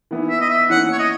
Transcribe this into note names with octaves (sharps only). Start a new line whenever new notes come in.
E3 B3 E4
E5
D#5
E5
E3 A#3 C#4 E4 F#5
C#5
D#5